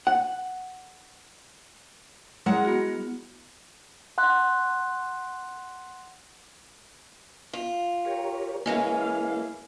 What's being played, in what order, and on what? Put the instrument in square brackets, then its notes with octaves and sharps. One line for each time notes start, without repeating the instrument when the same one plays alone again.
[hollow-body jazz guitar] F#5
[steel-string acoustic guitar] G#3 A#4 F#5 [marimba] E4 G#4
[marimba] B3 F#4
[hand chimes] F#5 C6 F#6
[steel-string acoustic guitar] F4
[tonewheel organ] G4 A#4 C#5
[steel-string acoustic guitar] E3 G#3 C#4 [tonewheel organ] A#3 E4 F5